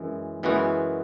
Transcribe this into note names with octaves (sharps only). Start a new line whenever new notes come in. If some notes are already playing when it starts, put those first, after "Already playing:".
Already playing: F#2 E3 G#3
F#2 E3 G#3 B3 F#4